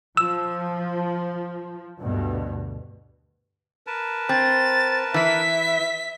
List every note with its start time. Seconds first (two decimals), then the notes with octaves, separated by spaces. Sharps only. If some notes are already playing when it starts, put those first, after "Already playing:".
0.17 F3 E6
1.99 D2 G2 B2
3.87 A#4 B4 A5
4.29 C4 A6
5.14 E3 E4 E5 B6